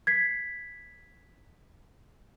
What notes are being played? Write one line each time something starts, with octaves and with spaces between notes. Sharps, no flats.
G#6 B6 C7